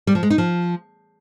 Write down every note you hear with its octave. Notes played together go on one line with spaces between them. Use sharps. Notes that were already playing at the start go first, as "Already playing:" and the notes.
G3
F3
G#3
D#4
F3